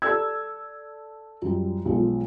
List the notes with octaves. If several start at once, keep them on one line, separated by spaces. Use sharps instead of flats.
A4 D5 E6 G#6
F#2 F3 G3
B1 F3 G#3